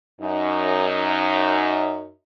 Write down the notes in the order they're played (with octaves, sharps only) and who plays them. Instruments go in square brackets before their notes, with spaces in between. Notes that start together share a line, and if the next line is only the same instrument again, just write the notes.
[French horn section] F#2 D#4